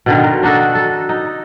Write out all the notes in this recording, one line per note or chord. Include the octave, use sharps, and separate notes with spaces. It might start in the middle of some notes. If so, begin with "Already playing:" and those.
B2 D3 D#3
A#4
D4 D#4 F#4 A4
A4
D#4